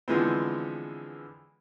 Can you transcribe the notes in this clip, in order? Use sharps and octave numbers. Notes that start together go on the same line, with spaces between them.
D3 E3 F3 G#3 B3 C4